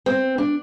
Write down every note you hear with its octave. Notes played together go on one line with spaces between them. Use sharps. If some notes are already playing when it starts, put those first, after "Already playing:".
C4
D4